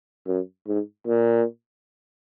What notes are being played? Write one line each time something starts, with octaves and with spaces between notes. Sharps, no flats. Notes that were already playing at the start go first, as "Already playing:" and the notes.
F#2
G#2
A#2